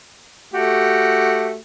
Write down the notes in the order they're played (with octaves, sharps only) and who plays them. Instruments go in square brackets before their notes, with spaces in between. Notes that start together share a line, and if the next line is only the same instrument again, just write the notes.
[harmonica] A3 F#4 G4